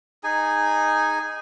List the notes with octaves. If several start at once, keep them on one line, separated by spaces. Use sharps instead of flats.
D#4 G#4 G#5